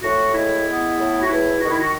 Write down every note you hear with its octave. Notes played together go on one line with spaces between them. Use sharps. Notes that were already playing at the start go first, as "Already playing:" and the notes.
A2 F#4
G#3 E4
B3
A2
F#4
E2 E4
D#3 F#4
E4
F#4